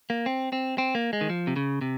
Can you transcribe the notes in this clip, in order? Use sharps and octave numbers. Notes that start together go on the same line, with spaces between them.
A#3
C4
C4
C4
A#3
G#3
D#3
F3
C3
C#3
C3